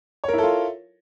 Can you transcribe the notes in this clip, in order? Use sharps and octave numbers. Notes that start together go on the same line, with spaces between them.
E4 F4 A4 A#4 C#5